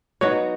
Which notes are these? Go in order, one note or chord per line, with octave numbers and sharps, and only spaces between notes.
F#3 B3 D#4 F#4 C#5